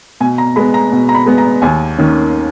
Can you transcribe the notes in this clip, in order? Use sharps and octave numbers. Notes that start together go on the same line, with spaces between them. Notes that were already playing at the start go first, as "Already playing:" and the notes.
B2 G#5
A#5
G#3 B3 B5
A#5
B2
A#5
B5
G#3 B3
A#5
D#2 G#5
D#3 A#3 C#4